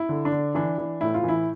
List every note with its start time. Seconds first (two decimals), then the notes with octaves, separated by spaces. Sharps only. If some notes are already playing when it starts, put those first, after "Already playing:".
Already playing: E4
0.09 D3
0.25 D4
0.32 D3
0.55 E3 D4
0.78 E3
1.01 A2 E4
1.14 F4
1.23 E3
1.28 E4